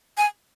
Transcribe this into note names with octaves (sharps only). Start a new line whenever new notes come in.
G#5